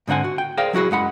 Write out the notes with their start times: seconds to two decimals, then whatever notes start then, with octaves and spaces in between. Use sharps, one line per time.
0.08 G#2 D3 C4 F#5 G#5
0.24 F#4
0.38 G5
0.57 G#4 A#4 C5 D5 F5 G5
0.73 F#3 E4 F#4 G#4 B4
0.91 F#2 G#3 F#5 B5